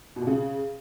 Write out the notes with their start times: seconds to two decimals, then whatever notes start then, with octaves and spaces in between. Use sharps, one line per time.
0.16 B2
0.22 A#2
0.27 C#3